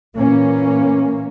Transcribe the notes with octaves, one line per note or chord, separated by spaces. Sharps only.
A#2 E3 A#3 C#4